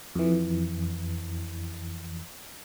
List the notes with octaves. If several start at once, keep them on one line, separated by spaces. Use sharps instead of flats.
F2 E3